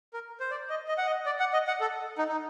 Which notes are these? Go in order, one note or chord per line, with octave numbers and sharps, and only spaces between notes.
A#4
C5
D5
D#5
D#5
F#5
D#5
D5
F#5
D#5
F#5
A4
D#4
D#4